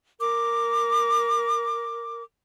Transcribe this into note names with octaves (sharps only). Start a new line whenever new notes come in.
A#4 D6